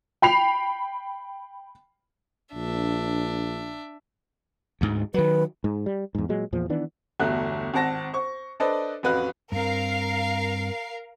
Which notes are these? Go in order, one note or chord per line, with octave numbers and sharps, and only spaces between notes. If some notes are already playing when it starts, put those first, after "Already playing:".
G5 B5 C7 F7
A#1 D4 E5
D2 G#2
D#3 F#3 B4
G#2
G3
E2 G#2
A#2 F#3 G#3
E2 A#2 F3
D#3 E3 B3 D4
G1 E2 A3 F#4 F#6
G#1 C4 F#5 A5 A#6
C5 C#6
D4 A4 B4 C5 D5 D#5
A1 F2 F#4 B4 F5 F#6
G2 C4 A#4 F5 C7